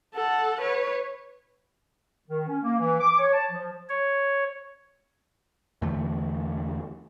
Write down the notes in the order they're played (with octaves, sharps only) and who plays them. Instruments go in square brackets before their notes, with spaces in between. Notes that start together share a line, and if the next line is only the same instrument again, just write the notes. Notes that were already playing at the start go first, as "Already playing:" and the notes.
[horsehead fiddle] A4 F#5
B4 C#5
[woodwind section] D#3
C#4
A#3
E3
D6
C#5
A5
F3
[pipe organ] C#5
[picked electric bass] E2 D3 E3 A3